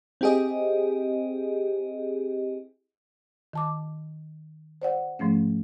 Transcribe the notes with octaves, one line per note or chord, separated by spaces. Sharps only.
C4 E4 G4 G#4 D#5
D#3 A5 D6
C5 D5 F#5
G#2 F3 A3 C#4